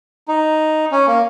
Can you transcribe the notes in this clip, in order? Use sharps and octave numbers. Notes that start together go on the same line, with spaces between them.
D#4
C#4
A#3